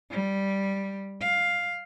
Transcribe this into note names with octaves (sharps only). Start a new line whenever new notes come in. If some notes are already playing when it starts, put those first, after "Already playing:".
G3
F5